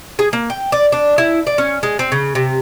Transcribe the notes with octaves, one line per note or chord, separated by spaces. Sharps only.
G#4
A#3
G5
D5
D4
E4
D5
C#4
G#3
C4
C#3
C3